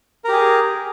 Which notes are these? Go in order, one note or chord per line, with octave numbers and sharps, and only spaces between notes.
G4 G#4 A#4